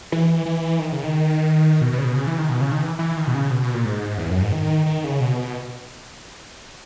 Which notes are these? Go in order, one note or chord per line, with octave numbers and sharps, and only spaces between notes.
E3
E3
D#3
C#3
D#3
B2
B2
C#3
B2
C#3
E3
D#3
B2
C#3
D#3
E3
E3
D#3
B2
C#3
B2
B2
A#2
G#2
E2
F#2
G#2
D#3
D#3
C#3
B2